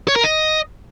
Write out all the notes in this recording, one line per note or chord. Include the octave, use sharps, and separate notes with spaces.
C#5
A#4
D#5